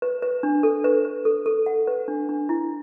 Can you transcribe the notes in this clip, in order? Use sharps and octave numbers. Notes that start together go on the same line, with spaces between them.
B4
B4
D4
A4
B4
B4
A4
A4
F#5
B4
D4
D4
E4